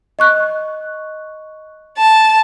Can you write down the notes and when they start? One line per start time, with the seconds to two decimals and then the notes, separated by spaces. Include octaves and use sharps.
0.19 D#5 C#6 F#6
1.98 A5